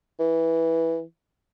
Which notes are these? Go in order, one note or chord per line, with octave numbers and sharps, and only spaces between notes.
E3